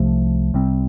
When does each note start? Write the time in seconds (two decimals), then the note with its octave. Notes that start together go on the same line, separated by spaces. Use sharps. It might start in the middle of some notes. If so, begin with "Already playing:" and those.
Already playing: C2 C3 F3 A3
0.54 C2 C3 G3 C4